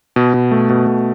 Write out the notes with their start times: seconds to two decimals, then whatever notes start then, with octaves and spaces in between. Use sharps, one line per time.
0.16 B2
0.34 B2
0.51 A3
0.70 B2
0.87 B2